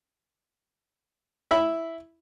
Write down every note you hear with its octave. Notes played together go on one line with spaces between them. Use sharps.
E4 E5 B5